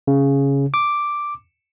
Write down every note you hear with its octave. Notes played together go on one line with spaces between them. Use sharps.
C#3
D6